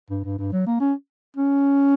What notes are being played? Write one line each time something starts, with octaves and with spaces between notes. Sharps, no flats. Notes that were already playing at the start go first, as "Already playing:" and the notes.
G2
G2
G2
F#3
A#3
C#4
C#4